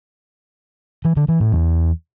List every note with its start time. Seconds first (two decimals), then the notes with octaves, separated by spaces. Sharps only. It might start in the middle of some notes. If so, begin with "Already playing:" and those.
1.05 E3
1.17 D3
1.28 E3
1.40 A2
1.52 E2